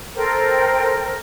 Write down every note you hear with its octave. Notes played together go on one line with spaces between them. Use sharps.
A4 A#4 C5 G5